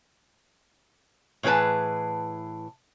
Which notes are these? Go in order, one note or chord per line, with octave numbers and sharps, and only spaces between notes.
A2 E3 G#4 B4 A5